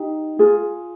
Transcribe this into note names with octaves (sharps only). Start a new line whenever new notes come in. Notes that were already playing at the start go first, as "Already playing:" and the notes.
Already playing: D#4 G4
F4 G#4